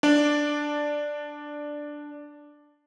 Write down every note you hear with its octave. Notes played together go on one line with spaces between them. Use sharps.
D4 D5